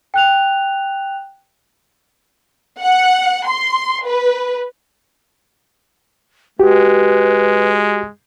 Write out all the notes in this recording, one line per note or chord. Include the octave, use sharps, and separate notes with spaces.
G5 F#6 F7
F#5
C6
B4
G#3 F#4 G4 B4